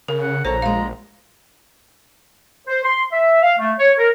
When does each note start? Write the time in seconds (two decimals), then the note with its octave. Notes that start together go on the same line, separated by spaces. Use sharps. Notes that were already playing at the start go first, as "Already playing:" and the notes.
0.08 C#3 A#4
0.22 F#5
0.45 A#1 A4 C5 C#5 A#5
0.62 G#3 F4 F5
0.81 A#1
2.67 C5
2.84 C6
3.12 E5
3.42 F5
3.59 A3
3.80 C#5
3.98 A#4